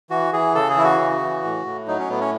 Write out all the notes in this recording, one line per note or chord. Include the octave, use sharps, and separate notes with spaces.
E3 F#4
E3 G#4
C#3 A4
G#4
E3 E4
F#4
C#3
E3
A2
A2
F#3 D#4
C#4
A2 B3
C#4